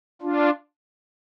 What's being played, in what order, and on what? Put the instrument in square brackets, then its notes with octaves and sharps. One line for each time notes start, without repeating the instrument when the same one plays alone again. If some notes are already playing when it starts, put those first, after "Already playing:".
[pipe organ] D4 F4